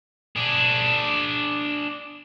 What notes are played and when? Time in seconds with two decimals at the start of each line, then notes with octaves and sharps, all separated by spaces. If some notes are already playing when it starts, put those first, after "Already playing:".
0.36 D4 G#4